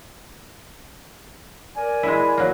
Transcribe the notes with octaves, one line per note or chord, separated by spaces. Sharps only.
A#4 D5 G#5
G#3 E4
F#3 A#3